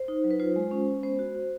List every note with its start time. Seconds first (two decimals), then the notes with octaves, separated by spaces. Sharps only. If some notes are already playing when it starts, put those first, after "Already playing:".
Already playing: C5
0.08 D#4
0.24 F#3
0.31 B4
0.40 F4 C5
0.56 G#3
0.71 C#4
0.87 G#3
1.03 B3 C5
1.19 F#4
1.35 F#4